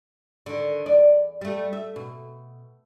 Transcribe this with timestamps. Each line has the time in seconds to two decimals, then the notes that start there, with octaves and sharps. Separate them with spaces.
0.46 D3 D#3
0.86 E2 D5
1.41 G3 A3
1.73 E5
1.96 B2